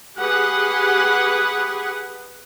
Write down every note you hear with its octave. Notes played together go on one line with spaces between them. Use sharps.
G4 G#4 B4 F#5